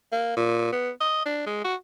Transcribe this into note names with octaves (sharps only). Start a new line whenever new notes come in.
A#3
A#2
B3
D#5
D4
G#3
F#4